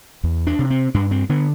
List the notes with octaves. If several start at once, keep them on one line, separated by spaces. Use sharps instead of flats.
E2
D4
C3
C4
G2 D4
C4
D3 B3